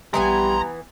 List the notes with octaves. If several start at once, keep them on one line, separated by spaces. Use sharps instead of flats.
A#1 E3 G3 B3 G#5 A#5 C6